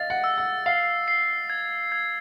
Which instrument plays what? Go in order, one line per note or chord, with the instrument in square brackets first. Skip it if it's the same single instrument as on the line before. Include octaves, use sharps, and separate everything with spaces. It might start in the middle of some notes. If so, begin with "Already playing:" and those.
Already playing: [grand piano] D#5 F5 [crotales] A6
[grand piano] F#5
[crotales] E6
[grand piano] F#5
[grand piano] F5 [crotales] C7
[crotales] C7
G#6
G#6